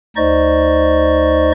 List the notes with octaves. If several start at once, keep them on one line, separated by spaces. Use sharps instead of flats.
D2 D#4 C5 D5 D#5 C#6